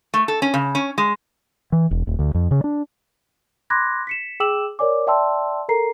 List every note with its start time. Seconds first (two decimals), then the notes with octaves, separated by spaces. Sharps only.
0.14 A3
0.28 A4
0.42 C#4
0.54 C#3
0.75 C#4
0.98 G#3
1.72 E3
1.91 E1
2.07 D#1
2.19 D2
2.35 F2
2.51 C#3
2.64 D4
3.70 B5 C6 D6 F#6 G#6 A#6
4.07 B6 C#7 E7
4.40 G#4 G5 D6 E6 E7 F#7
4.79 A#4 C#5 D5 G#5 D6
5.07 D5 E5 G5 A5 C6 E6
5.69 A4 A#4 A#5 C7